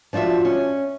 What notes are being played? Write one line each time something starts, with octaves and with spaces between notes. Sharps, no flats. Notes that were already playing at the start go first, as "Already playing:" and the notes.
F3 D4 F4 F#4 E5
C#4